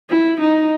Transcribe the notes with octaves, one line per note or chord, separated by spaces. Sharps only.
E4
D#4